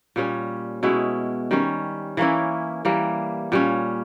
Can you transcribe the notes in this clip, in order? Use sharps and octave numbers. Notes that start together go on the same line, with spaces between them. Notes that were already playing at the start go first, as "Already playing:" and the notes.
A#2 G3 C#4
B2 G#3 C#4 E4
D#3 G3 C#4
E3 A#3 C#4 E4
E3 G3 A#3
A#2 G3 C#4